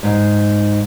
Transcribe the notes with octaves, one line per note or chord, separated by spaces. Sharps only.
G#2